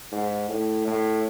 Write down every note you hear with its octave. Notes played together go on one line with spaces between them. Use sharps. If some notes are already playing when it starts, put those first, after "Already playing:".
G#2
A2
A2